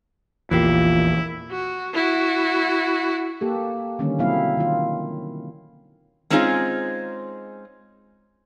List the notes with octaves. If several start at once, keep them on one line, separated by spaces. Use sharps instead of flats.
A#1 E2 E3 A#3 E4 F4 G4
F#4
E4 F#4
A#3 G4 A4
D3 D#3 G3 A#3 C#4
B2 F#3 A#3 C4 E4 F5
D#3 F4
G#3 C4 C#4 D#4 F4 G#4